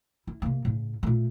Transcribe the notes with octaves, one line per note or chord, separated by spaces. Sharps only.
E4
C3 A#3
A2 C#3
A#2 A3